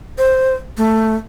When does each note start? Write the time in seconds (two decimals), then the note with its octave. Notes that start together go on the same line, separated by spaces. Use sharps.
0.18 C5
0.77 A3